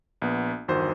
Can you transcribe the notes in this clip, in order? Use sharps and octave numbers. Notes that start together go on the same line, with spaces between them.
A#1 B3
G1 E2 D#3 F#4 C5